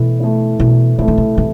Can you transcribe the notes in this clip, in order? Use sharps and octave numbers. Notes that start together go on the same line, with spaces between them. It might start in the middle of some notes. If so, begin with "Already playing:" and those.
Already playing: B2 E3 A3 E4
A3 E4
B2 E3
C3 A3 E4
D3
C3
C3 E3